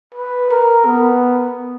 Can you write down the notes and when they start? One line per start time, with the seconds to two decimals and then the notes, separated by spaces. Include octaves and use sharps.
0.14 B4
0.50 A#4
0.85 B3